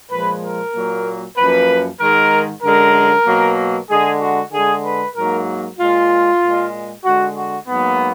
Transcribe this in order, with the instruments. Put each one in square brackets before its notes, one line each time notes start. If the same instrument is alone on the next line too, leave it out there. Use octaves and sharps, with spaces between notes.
[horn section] A#2 F3 G#3 B4
A#4
A#2 F#3 A#3
F#2 F3 A#3 B4
G#2 D#3 G#3 A#4
F#2 D3 G#3 A#4
B2 F#3 A#3
D3 G#3 G#4
F#4
D3 G#3 G#4
B4
G#2 F#3 A#3 A#4
A#2 G#3 F4
A#2 G#3
D3 G#3 F#4
F#4
G#2 F#3 A#3 B3